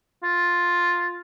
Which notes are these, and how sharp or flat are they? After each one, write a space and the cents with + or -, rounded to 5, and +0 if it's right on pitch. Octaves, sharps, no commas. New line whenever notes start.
F4 +5